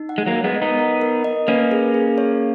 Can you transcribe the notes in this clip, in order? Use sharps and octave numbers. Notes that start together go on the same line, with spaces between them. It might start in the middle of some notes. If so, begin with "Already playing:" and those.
Already playing: D#4
F#5
G#3
F#3 A#3
A#4
G#3 B3
D#5
B3 D#4
A#4
A#4
D#5
A#3 C#4 B4
G#4
G#4
C#5